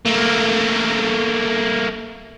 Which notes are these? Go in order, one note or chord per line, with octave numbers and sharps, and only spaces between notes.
A3 A#3